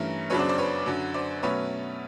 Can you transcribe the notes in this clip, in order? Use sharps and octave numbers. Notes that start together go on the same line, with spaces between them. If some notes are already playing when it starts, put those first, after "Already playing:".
Already playing: G2 E3 A3 C#4 A#4
F#2 C#3 F#3 B3 D4 B4 C#5
C5 D5
C5 D5
B4 C#5
F#2 D3 F#3
C5 D5
B2 F#3 A3 C#4 B4 C#5